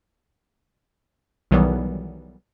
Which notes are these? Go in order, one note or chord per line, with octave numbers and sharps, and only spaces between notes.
B1 D#3 E3 F#3 G3 B3